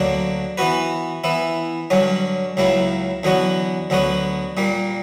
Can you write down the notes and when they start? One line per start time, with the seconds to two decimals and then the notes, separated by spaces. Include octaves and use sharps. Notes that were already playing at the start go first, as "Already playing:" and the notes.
Already playing: D2 D3 F#3 A#3 D4
0.58 E3 B3 F#4 B4
1.24 E3 B3 E4
1.90 G2 D3 F#3 C#4
2.57 C#2 C#3 F#3 A#3 E4
3.23 E2 D3 F#3 B3 F#4
3.90 D2 D3 F#3 B3 F#4
4.57 A#2 G3 A#3